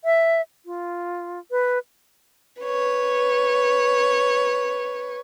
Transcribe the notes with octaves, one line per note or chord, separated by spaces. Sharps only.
E5
F4
B4
B4 C#5